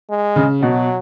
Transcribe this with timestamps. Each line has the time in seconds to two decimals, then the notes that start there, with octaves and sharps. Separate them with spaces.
0.10 G#3
0.36 C#3
0.61 B2 F#3